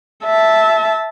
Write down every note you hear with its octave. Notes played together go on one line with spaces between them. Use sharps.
E5 A5